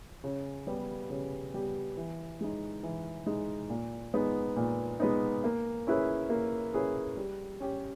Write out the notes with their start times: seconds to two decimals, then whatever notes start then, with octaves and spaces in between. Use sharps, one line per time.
0.24 C#3
0.67 G3 B3 G4
1.10 C#3
1.54 G3 B3 G4
1.97 E3
2.41 G#3 D#4
2.83 E3
3.26 G#3 D#4
3.70 A#2
4.14 G#3 B3 D#4
4.57 A#2
5.00 G#3 B3 D#4
5.44 A#3
5.87 C#4 E4 G#4 B4
6.29 A#3
6.73 C#4 E4 G#4 B4
7.17 G3
7.60 C#4 G4